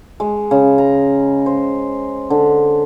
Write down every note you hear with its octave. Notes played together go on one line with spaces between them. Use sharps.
G#3
C#3
A#5
C5
D3